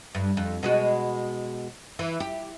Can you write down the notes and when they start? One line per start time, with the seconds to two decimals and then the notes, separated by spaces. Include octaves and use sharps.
0.15 G2
0.37 F2
0.63 B2 G#3 F#4
1.99 E3
2.20 G4